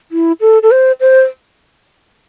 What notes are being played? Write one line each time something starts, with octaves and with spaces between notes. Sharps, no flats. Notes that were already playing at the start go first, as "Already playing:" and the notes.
E4
A4
A4
C5
C5